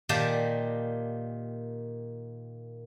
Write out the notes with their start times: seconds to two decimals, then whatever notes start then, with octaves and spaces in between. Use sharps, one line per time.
0.09 A#2 D#3 A#3 G4 D5 A5